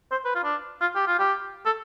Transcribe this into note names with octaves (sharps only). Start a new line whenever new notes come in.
C5
B4
F4
D4
F4
G4
F4
G4
A4